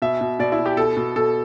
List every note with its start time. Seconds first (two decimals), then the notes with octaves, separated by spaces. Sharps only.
0.02 B2 E5
0.21 B2
0.39 B2 D5
0.52 E4
0.59 B2
0.66 G4
0.77 B2 A4
0.97 B2
1.16 B2 A4